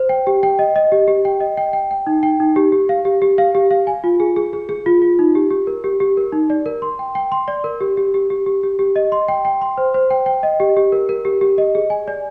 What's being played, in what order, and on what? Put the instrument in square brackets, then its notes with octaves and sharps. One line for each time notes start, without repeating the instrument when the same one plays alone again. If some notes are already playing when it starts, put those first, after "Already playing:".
Already playing: [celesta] C5
G5
G4
G5
D#5
D#5
G4
G4
G5
D#5
G5
G5
G5
D#4
G5
D#4
G4
G4
F5
G4
G4
F5
G4
F5
G#5
F4
G#4
G#4
G#4
G#4
F4
F4
D#4
G4
G4
A#4
G4
G4
A#4
D#4
D5
A#4
C6
G5
G5
C6
D5
A#4
G4
G4
G4
G4
G4
G4
G4
D#5
C6
G5
G5
C6
C5
C5
G5
G5
D#5
G4
G4
A#4
A#4
G4
G4
D#5
G#4
G#5
D5